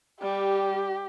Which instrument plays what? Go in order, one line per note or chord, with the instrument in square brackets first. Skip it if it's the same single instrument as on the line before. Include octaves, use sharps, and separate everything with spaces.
[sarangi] G3 [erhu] G4